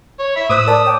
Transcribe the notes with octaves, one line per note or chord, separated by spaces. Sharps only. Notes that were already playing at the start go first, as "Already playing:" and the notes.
C#5
E5 B5
A2 C5 D#6 E6 F#6
A#4 D5 A5
C#5 G5 D6